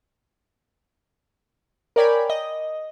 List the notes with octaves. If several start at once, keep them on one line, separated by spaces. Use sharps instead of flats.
A#4 C#5 D5 G5 G#5 B5
D#5